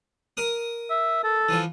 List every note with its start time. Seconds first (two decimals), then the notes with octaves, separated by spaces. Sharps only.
0.37 A#4 D#6
0.90 E5
1.24 A4
1.49 E3 F3